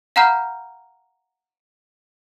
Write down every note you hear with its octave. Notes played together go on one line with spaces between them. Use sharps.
F5 F#5 A#5 B5 F6 G6